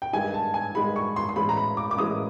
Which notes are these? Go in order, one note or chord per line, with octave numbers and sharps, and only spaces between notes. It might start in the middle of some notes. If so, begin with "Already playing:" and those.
G5
G2 D#3 G#3 G#5
A5
G#5
G2 D#3 G#3 B5
C#6
C6
C6
A2 E3 G#3 C#4 E4 B5
A#5
B5
D6
D6
A2 E3 G#3 C#4 E4 D#6